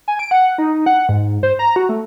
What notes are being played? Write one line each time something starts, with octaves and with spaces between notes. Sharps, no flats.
G#5
D7
F#5
D#4
F#5
G#2
C5
A#5
F#4
A3